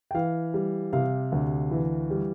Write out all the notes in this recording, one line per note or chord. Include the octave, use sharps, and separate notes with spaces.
G5
E3 F5
G3
C3 F5
D2
E3
G3